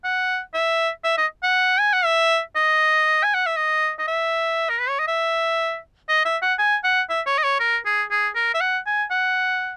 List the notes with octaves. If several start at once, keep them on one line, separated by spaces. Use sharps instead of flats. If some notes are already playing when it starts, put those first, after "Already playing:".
F#5
E5
E5
D#5
F#5
G#5
F#5
E5
D#5
G#5
F#5
E5
D#5
D#5
E5
A#4
B4
C#5
D#5
E5
D#5
E5
F#5
G#5
F#5
E5
C#5
D#5
C#5
A#4
G#4
G#4
A#4
E5
F#5
G#5
F#5